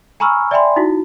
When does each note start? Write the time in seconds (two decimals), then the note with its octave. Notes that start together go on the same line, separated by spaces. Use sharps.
0.20 G#5 A#5 B5 C#6 E6 F6
0.51 D5 E5 G5 G#5 B5 C6
0.76 D#4 E4 F#4